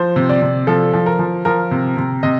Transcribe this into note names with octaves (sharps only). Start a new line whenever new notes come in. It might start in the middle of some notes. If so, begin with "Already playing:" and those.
Already playing: F3 C5
C3
D5
C3
F3 A4
F3
A#4
F3
F3 A#4
C3
C3
C3 D#5